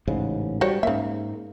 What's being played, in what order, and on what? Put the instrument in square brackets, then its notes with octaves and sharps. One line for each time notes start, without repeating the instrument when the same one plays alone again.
[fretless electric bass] A1 G#2 C#3
[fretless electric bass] G3 [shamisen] F#4 C5 C#5
[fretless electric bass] G#2 A#3 [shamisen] C#3 E5